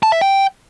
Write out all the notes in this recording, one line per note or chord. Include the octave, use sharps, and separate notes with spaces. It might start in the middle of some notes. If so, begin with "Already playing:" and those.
A5
E5
G5